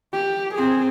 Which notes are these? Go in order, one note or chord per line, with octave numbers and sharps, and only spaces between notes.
G4
C4 G#4